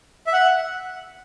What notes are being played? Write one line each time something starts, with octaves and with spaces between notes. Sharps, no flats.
E5
F#5